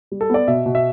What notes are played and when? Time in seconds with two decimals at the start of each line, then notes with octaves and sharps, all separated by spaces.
0.11 G3
0.21 A4
0.30 B3 D5
0.48 B2 E5
0.66 B2
0.75 E5